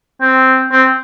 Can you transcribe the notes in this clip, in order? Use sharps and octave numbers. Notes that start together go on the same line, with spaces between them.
C4
C4